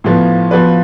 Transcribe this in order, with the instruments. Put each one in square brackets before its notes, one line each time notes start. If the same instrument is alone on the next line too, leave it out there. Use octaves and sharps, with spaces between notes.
[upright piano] A2 F3 B3
F3 B3 F#4 B4